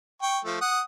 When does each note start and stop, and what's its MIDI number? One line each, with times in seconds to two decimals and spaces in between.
0.22 0.39 79
0.22 0.39 85
0.45 0.58 53
0.45 0.58 57
0.61 0.81 78
0.61 0.81 87